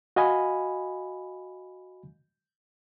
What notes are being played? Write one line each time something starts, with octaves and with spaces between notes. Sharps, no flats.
F#4 D#5 F5 G#5 B5